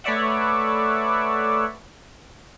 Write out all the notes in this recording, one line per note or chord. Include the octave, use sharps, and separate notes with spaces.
A3 B4 C#5 D5 E5 F#5